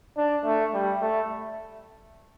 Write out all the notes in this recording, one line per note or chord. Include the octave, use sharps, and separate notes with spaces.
D4
A3
G3
A3